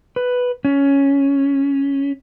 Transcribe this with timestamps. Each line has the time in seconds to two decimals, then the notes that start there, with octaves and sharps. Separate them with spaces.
0.16 B4
0.65 C#4